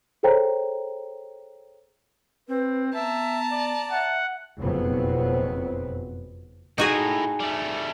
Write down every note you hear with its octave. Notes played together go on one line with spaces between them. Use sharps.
G#4 A4 C5 C#5 G5 A#5
C4 B4
B3 E5 A5 A#5
D5
E5 F#5
F#1 F2 B2 F#3 B3 C4
A2 D#4 F#4 G#4
G3 A3